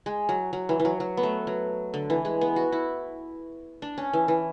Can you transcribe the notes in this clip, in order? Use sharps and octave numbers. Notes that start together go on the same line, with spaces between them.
G#3
F#3
F#3
E3
E3
F#3
F#3
B3
A3
F#3
D3
E3
G#3
B3
F#4
E4
D4
C#4
E3
E3